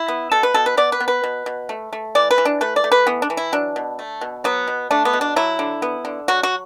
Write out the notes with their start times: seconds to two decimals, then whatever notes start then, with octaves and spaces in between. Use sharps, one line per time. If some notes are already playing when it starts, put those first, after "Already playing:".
Already playing: E4
0.08 B3
0.31 B2 A4
0.43 B4
0.54 B2 A4
0.66 B4
0.77 B3 D5
0.92 B4
1.00 B3
1.08 B4
1.24 B2
1.46 B2
1.69 A3
1.93 A3
2.15 E3 D5
2.31 B4
2.38 E3
2.45 D4
2.61 A3 B4
2.76 D5
2.84 A3
2.92 B4
3.07 E3 B3
3.22 D4
3.30 E3
3.37 E4
3.53 F#3 D4
3.76 B2
3.99 A3
4.21 B2
4.44 F#3 B3
4.67 B2
4.91 A3 D4
5.05 B3
5.13 B2
5.21 D4
5.36 F#3 E4
5.59 D3
5.82 B3
6.05 D3
6.28 F#3 F#4
6.43 F#4